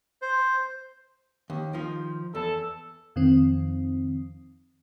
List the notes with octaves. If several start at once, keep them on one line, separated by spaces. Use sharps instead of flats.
C5
D#2
D#3 F3
E2 A4
F2 D#3 C4